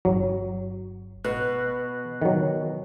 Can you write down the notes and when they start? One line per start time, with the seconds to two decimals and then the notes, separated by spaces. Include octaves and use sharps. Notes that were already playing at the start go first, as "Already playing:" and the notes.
0.05 G1 F#3
1.24 B2 F#6
2.22 D#3 F#3